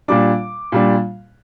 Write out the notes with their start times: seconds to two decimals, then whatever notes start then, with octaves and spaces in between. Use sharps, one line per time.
0.08 A#2 G3 D4 D6
0.72 A#2 G3 D4